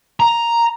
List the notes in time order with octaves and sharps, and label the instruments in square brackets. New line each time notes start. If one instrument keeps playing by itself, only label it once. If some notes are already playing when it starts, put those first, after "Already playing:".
[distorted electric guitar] A#5